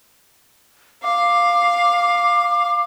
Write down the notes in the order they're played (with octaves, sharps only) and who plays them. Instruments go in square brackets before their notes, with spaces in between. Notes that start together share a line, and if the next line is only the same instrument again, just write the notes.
[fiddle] F5 [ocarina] D6